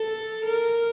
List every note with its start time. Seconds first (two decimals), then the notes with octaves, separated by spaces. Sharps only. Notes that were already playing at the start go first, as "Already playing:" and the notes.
Already playing: A4
0.46 A#4